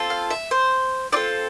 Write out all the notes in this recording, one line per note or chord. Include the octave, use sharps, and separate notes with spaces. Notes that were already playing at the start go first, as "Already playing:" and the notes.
Already playing: C4 F4 A4
F5
E5
C5
C4 F4 A4 D5